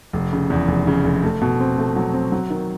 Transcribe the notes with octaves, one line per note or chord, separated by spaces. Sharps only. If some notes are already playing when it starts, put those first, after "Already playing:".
F1
C#3
E2
F1
C#3
F1
A3
B2
C4
A3
F#3
C4
F#3
D#3